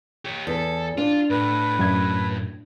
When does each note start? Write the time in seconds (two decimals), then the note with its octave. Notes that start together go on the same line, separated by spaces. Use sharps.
0.25 G4 C#5
0.47 E2 A4
0.98 D4 F4
1.30 A2 B4
1.79 F#2 G#6